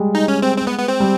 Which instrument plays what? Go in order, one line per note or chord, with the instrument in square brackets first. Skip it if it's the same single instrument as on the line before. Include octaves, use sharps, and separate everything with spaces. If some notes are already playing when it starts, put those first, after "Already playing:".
Already playing: [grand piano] G3 G#3
[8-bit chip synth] D#4
C#4
C4
C4
B3
B3
C4
[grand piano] G3